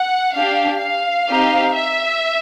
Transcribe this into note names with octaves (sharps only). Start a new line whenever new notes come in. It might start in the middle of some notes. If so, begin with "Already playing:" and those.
Already playing: F#5
D4 G4 F5
F5
C4 D#4 G4
E5